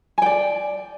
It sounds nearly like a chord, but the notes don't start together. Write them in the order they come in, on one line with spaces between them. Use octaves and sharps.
G#5 G5 D5